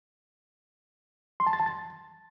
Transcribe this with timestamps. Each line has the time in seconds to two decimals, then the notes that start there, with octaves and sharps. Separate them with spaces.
1.40 C6
1.47 A5
1.53 A6
1.60 A5
1.66 A6